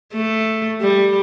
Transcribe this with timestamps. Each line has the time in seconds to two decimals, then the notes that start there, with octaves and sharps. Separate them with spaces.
0.13 A3
0.81 G3